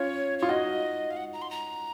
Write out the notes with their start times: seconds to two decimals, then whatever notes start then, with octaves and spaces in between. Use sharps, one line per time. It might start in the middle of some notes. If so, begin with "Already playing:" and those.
Already playing: C#4 F4 C#5
0.39 F4 C#5
0.48 D#4 F#4 D#5
1.11 F5
1.17 F#5
1.33 A#5
1.42 C6
1.51 A#5